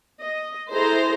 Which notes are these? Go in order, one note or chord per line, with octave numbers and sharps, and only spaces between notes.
D#5
E4 G#4 A4 C5 A#5